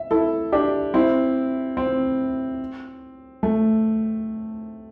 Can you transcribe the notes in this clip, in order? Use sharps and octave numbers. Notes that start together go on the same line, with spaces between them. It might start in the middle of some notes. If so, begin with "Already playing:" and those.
Already playing: E5
E4 A4
D4 G4
C4 E4
C4
A3